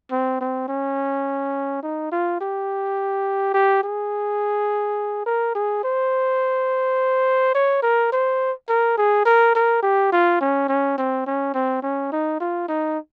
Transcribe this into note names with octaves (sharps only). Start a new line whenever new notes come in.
C4
C4
C#4
D#4
F4
G4
G4
G#4
A#4
G#4
C5
C#5
A#4
C5
A#4
G#4
A#4
A#4
G4
F4
C#4
C#4
C4
C#4
C4
C#4
D#4
F4
D#4